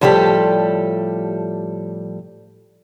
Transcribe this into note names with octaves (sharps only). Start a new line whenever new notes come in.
A2 F3 G3 G4 A4